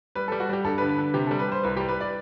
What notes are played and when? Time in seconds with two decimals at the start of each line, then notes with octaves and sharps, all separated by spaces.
0.15 G3 B4
0.28 A4
0.32 G3
0.40 F#4
0.49 G3 G4
0.64 G2 A4
0.78 B4
0.82 D3
0.89 B4
0.98 D3
1.14 C3 G4
1.27 G3 A4
1.39 B4
1.48 G3 C5
1.63 C2 B4
1.77 G4
1.80 G3
1.89 B4
2.00 D5